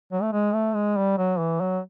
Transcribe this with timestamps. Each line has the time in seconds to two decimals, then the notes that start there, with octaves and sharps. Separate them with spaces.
0.12 F#3
0.22 A3
0.32 G#3
0.54 A3
0.75 G#3
0.97 G3
1.18 F#3
1.39 E3
1.60 F#3